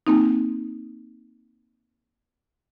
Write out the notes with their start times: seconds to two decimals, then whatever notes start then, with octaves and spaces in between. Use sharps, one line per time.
0.07 A#3 C4 D#4